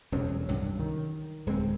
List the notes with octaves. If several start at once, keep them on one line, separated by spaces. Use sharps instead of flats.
E1 F2 F#3 C#4
C2 G2 F#3
D#3
D1 G#3 C4